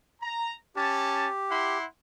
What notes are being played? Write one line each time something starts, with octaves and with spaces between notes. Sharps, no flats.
A#5
C#4 G4 A5
E4 F#5 C6